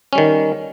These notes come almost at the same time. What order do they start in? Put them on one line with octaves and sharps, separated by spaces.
C#4 G3 D#3